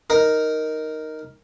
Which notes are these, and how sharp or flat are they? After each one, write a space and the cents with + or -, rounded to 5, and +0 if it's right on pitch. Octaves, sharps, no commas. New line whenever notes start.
D#4 +0 A#4 +0